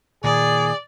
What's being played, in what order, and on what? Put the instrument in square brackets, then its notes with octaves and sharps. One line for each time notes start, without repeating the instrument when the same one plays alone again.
[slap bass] A#2 D#3 [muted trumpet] G#4 [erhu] D5